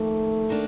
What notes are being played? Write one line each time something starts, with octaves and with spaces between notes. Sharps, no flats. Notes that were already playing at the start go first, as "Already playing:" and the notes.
Already playing: F2 D#3 A3 A#3
D#3 A#3 D4